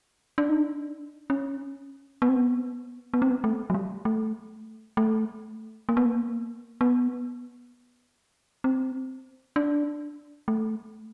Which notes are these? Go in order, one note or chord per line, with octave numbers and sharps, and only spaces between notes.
D4
D#4
D4
C#4
B3
C4
B3
B3
C4
B3
A3
F#3
G3
A3
A3
A#3
B3
A#3
B3
C4
D4
A3